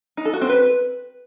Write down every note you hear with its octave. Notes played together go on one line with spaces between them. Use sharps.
D#4
A4
F#4
C4
B4